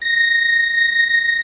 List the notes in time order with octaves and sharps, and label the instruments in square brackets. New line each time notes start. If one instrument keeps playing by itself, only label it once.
[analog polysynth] A#6